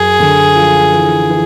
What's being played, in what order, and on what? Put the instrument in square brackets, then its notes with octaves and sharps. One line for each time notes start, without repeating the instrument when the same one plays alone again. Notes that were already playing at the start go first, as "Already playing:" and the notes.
Already playing: [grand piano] F#2 [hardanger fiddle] G#4
[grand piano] D3
F3
E3
E3